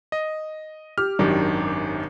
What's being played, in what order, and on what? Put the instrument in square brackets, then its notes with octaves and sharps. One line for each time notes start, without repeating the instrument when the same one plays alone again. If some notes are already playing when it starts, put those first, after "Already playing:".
[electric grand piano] D#5
[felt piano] G4 [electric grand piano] F6
[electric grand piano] G#1 D#3 D4 [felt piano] F#2 G4